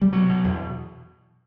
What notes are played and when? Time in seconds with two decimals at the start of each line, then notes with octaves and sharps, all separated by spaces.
0.01 G3
0.13 B2 F#3
0.29 B2
0.44 E2